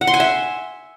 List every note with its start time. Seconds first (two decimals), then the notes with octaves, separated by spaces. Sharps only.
0.01 F#5
0.07 C6
0.14 G#5
0.20 E5